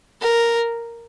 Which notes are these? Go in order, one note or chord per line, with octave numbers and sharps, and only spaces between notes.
A#4